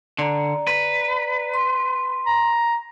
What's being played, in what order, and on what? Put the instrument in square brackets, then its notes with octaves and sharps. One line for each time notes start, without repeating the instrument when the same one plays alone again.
[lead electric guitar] D3 [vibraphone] D5 A#5
[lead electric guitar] B4
[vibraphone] C6
[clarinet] A#5